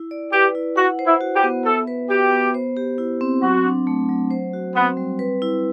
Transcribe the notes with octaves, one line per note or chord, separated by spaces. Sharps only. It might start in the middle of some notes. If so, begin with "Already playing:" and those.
Already playing: E4
D5
G4 B4
E4
F#4 F#5
C5
E4
F#4
G4
B3
A4 E5
B4
F#4 G4
B3
C5
G4
E4
C4
F#3 F#4
D4
A3
F#3
C5
F#4
B3 C4
G3
B4
E4